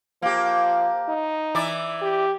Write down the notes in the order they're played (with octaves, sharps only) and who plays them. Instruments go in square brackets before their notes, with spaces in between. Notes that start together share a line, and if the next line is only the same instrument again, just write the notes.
[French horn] F3 [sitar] A#3 G4
[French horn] D#4
[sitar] E3 E4 D5
[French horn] G4